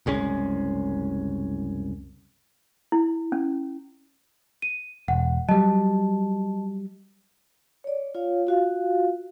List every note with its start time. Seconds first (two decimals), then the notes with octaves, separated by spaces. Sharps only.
0.06 F#1 C2 G#3 C#4
2.92 E4
3.32 C#4
4.62 D#7
5.08 E1 F#5
5.49 F#3 G3 D#5 A5
7.84 C#5 D5
8.15 F4 C#5 F5
8.47 F4 F#4 F5